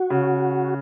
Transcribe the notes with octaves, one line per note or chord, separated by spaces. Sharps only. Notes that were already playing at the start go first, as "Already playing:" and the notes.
Already playing: F#4
C#3